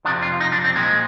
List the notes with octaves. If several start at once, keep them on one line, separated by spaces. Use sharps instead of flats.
F2 C3 F3 D4
F4
D#4
D4
C4
A#2 F3 G#3